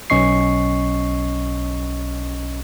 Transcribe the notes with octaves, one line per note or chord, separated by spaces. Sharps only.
B1 C#4 D#5 C#6 C7